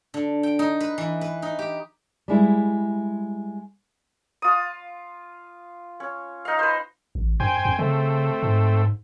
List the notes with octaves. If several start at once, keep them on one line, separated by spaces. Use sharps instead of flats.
D3
G5
D#4
B4
E3
B4
D#4
G4
G3 G#3 E4
F4 D#6
C#4
D#4 F5
B4 C5
A1
F#2 C5 G5 G#5
F2
C#3 A3 C4
G#2